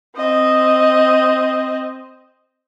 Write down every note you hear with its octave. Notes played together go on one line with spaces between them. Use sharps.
C4 D#5